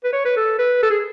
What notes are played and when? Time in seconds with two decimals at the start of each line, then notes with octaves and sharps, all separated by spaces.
0.04 B4
0.13 C#5
0.25 B4
0.37 A4
0.59 B4
0.83 A4
0.90 G#4